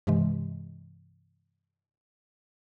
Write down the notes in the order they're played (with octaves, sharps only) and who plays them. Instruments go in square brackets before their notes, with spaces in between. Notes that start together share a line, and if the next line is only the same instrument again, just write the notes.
[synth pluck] G2 C3 E3 G#3